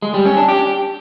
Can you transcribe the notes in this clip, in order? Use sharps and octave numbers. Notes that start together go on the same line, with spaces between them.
G#3
G3
C#4
D4
G4